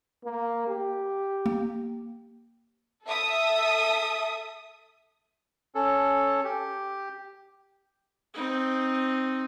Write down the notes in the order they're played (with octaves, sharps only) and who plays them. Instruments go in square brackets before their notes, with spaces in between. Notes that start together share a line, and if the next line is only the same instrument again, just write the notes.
[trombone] A#3
G4
[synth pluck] A#3
[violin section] A4 E5 D#6
[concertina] C#4 A4
G4
[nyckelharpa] C4 D#4